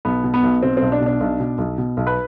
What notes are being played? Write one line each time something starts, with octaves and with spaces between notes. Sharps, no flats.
B1 B3
B2
B3
B1
B2 C4
B1 C4
D4
B2
D4
B1
B2
B1
B2
B1
B4